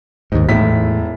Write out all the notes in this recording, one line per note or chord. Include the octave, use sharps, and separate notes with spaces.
D#2 G#2 D#4
E1 E2 A2 E4 B6